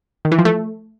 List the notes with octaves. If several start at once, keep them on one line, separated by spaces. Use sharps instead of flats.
D#3
E3
F3
A3